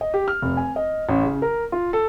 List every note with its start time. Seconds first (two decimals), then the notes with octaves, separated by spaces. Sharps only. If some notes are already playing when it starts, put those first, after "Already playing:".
0.01 D#5
0.14 G4
0.28 F6
0.42 F1
0.57 G#5
0.76 D#5
1.09 A1
1.23 C#3
1.42 A#4
1.72 F4
1.93 A4